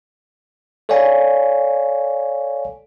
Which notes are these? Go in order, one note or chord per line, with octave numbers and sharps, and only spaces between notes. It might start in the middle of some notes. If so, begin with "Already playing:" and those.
A4 C#5 D5 F5 G#5